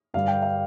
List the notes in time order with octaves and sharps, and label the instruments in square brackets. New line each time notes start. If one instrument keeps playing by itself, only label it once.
[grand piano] G2 D3 G3 F5
G5
F5